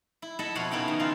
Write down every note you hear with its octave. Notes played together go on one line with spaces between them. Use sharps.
E4
E4 A4 D#5 E5 F#5
F2 B2 B4 C#5 F5 F#5
C#3 B3 D#4 E4 G5
D#3
C#3 D#4 F4 F5